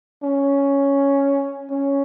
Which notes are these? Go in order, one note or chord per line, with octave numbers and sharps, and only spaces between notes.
C#4
C#4